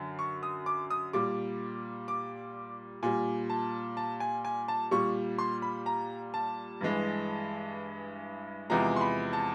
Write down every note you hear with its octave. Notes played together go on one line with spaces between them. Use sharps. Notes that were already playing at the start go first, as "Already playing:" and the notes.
Already playing: F#2 D3
C#6
D#6
D6
D#6
A#2 G3 D6
D6
A#2 G3 G#5
A5
A5
G#5
G#5
A5
A#2 G3 C#6
C6
B5
A#5
A5
G2 E3 G#3
E2 C3 F3 G#3 A#5
C6
B5
A5